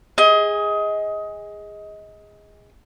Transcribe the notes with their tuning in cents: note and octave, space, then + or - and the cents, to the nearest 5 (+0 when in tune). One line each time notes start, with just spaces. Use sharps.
G#4 -15 D#5 +20